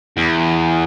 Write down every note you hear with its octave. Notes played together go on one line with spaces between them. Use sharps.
E2